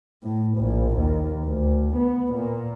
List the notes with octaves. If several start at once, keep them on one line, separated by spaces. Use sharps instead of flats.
A2
A#1
D#2
D2
B3
A#2